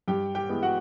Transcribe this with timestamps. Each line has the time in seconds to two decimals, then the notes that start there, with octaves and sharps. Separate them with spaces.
0.08 G2 G4 G5
0.35 G4 G5
0.49 E3 G#3 B3
0.62 F#4 F#5